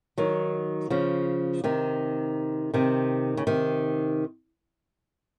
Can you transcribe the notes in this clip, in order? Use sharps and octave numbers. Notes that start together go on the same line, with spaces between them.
D#3 F#3
C#3 F3
C3 D#3
C3 D#3
C#3
C3 D#3